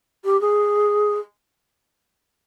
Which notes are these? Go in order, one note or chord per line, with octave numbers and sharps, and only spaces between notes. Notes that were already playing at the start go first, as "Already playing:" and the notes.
G4
G#4